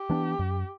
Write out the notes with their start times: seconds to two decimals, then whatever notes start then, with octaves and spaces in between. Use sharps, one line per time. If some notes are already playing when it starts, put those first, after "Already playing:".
Already playing: G4
0.10 E3 B3 D4
0.39 F#2